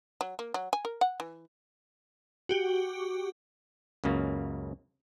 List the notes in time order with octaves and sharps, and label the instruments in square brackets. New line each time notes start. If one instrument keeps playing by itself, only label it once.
[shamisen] F#3
A#3
F#3
G#5
A#4
F#5
E3
[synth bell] F#4 G4
[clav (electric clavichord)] C#2 F#2 C#3 A#3